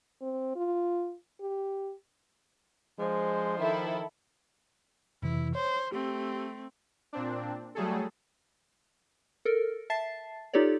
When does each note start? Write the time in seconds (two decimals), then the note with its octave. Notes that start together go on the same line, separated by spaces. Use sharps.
0.21 C4
0.56 F4
1.41 G4
2.99 F3 G#3 D4 C5
3.59 D#3 E4 A4
5.22 F2 C3 E3 E4
5.55 C5 C#5
5.92 A3 C4 G4
7.13 A#2 C4 D4
7.75 F#3 G3 A3 G#4 A4
9.45 A4 A#4
9.90 E5 A5 A6 C7
10.53 D#4 F4 G4 A4 C#5 D5